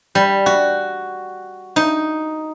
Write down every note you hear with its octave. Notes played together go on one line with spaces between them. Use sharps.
G3
F#4
D#4